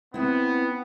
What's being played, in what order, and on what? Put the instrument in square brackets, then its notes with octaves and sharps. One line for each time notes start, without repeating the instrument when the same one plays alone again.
[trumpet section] B3 [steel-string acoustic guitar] C4 E4